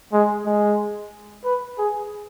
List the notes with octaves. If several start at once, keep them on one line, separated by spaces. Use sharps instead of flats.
G#3
G#3
B4
G#4